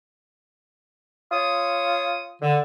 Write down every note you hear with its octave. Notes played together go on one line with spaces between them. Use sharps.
F4 C#5 D#6
D3